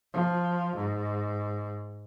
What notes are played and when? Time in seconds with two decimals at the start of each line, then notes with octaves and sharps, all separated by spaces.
0.13 F3
0.76 G#2